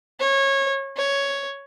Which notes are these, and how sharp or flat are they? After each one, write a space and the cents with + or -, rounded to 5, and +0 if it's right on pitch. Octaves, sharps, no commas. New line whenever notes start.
C#5 -20
C#5 +5